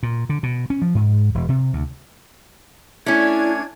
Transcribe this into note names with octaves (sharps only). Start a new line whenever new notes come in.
A#2
D3
B2
C#4
F3
G#2
E1
C3
D2
A3 C#4 D4 E4 G#6